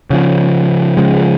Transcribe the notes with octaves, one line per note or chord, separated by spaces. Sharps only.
C#3 F3 C#4
C#3 F3 G#3